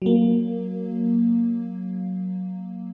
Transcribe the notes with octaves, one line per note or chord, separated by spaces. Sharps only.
F#3 A#3